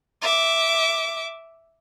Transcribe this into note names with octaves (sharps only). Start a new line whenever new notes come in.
E5 D6